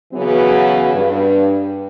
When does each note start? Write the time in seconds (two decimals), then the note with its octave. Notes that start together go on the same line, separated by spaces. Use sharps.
0.13 C#3 E3 F#3 B3 F#4
0.93 G2